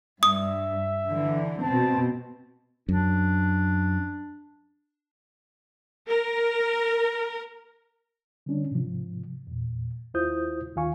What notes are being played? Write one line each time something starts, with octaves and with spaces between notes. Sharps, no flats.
G2 E5 D#6
D3 E3
B2 C4 A5
F#2 D4
A#4
D3 G3 C#4 D4
G#2 C3 F3
E2 A#2
D#2 E4 F4 C5 D#6 G6
D#2 D#3 F4 F5 G#5 C#6